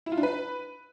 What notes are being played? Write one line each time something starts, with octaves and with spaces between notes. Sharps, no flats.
E4
F4
D4
B4